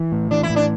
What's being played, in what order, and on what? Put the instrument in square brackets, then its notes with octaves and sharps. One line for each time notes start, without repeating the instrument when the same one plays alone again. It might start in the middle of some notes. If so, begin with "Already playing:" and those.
Already playing: [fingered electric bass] E3
A2
[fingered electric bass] E3 [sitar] D4
[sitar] E4
[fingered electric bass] A2
[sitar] D4